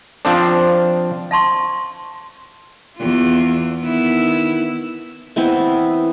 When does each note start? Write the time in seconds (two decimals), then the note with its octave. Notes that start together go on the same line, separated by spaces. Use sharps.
0.25 F3 C4 D4
1.31 F5 A5 C6 C#6
2.97 E2 F4
3.83 D#3 B3 E4
5.36 E3 B3 C4 E4